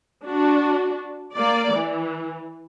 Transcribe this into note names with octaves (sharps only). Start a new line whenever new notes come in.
D4 F#4
A#3 D5
E3